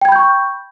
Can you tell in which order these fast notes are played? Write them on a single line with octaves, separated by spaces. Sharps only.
G5 G#6 B5 G6 C#6